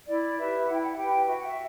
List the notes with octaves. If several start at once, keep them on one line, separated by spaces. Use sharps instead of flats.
E4 D5
G4 B4 E5
E4 F#5
G5
F#5
G4 B4 G5
F#4 E5
F#5
E5